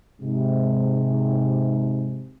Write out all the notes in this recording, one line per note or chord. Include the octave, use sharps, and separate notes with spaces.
G#2 C3